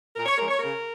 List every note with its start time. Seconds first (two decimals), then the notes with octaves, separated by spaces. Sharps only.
0.16 A#2 A#4
0.26 C#5
0.38 F3 G#3 C#4 A#4
0.48 C#5
0.60 C#3 A#4